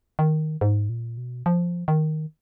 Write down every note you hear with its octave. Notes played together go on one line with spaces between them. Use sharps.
D#3
G#2
A#2
B2
F3
D#3